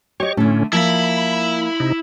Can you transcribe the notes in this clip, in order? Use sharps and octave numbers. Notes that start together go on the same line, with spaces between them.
G4 C#5 D#5 C#6
A2 D3 A3 C#4
F3 A#3 E4 E5 B5
C3 D#4